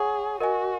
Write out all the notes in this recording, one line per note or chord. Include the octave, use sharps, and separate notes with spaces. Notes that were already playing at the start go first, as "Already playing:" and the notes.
Already playing: G#4 C#5 F#5 C#6
F#4 A#4 D#5 G#5